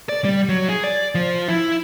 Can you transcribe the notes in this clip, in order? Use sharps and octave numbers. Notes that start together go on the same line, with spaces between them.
D5
G3
F#3
G#4
D5
F3
E4